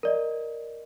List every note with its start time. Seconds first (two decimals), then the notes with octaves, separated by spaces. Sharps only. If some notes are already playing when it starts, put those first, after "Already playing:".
0.03 A#4 D5 D#5